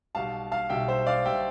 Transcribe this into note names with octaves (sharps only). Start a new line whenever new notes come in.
B1 B2 G3 F5 A5
F5 A5
B1 B2 G3 E5 G5
C5 E5
D5 F5
B2 G3 E5 G5